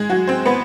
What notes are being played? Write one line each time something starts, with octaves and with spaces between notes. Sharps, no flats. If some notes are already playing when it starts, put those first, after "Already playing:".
Already playing: G#3 G#4
F#3 F#4
C4 C5
B3 B4